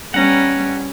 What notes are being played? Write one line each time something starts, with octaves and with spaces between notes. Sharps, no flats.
G3 B3 C#4 F#5 A#5